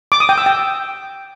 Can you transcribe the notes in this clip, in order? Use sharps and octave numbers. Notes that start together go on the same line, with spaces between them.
D6
D#6
G5
E6
G5